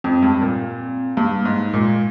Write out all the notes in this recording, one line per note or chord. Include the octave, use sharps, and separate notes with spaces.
F2 C4
G2
A#2
G2 A#3
G#2
A#2 G#3